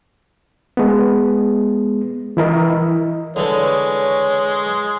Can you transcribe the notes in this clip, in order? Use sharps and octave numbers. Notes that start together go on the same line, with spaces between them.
G#3 B3
E3 E4 A#4 D#5
D3 E3 G#3 A4 C#5